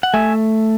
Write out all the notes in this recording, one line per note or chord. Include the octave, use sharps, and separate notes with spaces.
F#5
A3 E5 G#5